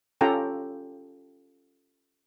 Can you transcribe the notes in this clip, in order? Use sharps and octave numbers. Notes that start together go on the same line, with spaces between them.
C#4 F4 G4 A4 G5 A#5